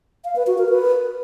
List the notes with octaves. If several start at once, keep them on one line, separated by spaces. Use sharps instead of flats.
F5
B4
F#4
A#4
B4